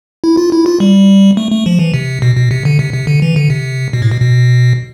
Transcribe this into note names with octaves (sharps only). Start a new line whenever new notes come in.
E4
F4
E4
F4
G3
A3
A3
F3
E3
C3
B2
B2
C3
D3
C3
C3
D3
E3
D3
C3
B2
A2
B2
B2